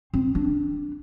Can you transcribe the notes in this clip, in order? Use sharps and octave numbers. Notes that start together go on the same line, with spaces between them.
C4
D4